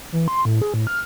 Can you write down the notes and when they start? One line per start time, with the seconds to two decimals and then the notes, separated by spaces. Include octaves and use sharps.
0.12 E3
0.28 C6
0.45 A2
0.62 G#4
0.74 A2
0.87 F6